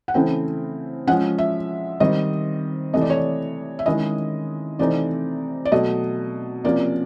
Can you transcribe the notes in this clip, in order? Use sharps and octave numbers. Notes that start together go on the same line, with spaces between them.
F#5
C#3 E3 A3 C4 E4 G5
F3 G#3 C#4 F#5
E5
D#3 G3 C4 D#5
C3 E3 A3 D#5
D5
C#5
D5
E5
D#3 G#3 C#4 E4 D#5
C3 E3 A3 C4 D#4 D5
D5
B2 F#3 A3 D#5
C3 F3 A#3 C#4 D5